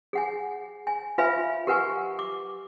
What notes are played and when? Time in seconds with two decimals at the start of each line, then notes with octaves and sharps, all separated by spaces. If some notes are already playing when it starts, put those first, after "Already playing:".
0.13 G#4 F#5 G#5
0.87 G#5
1.18 F4 B4 E5 F5 G#5 B5
1.67 G4 A#4 B4 F#5 G#5 C#6
2.19 D6